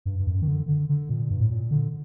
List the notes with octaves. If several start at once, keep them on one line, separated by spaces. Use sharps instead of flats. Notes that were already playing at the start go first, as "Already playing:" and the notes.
G2
G2
F#2
D#3
D3
D3
D3
A#2
G2
A2
A#2
D3